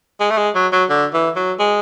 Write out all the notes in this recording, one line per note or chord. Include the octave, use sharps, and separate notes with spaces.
G#3
A3
G#3
F#3
F#3
D3
E3
F#3
G#3